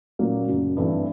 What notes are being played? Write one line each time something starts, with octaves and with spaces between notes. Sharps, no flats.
A#2 F#3 A#3 C#4
F#2 C#3 F#3
G2 E3 A3 C4 E4